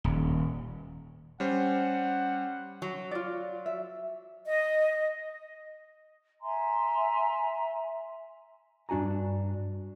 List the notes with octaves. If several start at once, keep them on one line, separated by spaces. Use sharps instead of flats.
D#1
G3 C#4 C5 F#5
F#3
F4 D5
E5
D#5
E5 G#5 A#5 C6
G2 D4 F#4 G#5 A#5